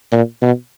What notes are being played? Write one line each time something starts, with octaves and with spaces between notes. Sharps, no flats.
A#2
B2